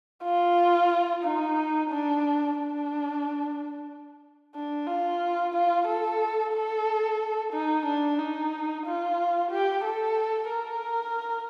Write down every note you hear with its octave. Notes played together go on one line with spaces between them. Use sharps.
F4
D#4
D4
D4
D4
F4
F4
A4
A4
D#4
D4
D#4
F4
G4
A4
A#4